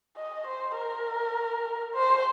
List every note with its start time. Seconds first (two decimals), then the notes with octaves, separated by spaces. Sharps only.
0.18 D#5
0.47 C5
0.77 A#4
1.95 C5